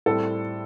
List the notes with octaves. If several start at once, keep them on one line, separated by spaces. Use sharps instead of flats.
A2 G3 C4 A4